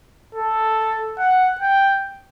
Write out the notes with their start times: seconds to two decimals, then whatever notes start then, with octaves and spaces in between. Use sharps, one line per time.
0.35 A4
1.19 F#5
1.61 G5